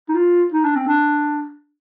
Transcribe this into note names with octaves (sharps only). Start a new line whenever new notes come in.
D#4
F4
D#4
D4
C4
D4